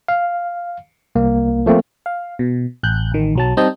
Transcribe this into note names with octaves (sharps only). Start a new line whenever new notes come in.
F5
C2 A#3
F3 A3 A#3 C4
F5
B2
A1 F#6 G6
A1 D#3
B1 F#3 A5
G3 C4 D#4 D#5 A5 G6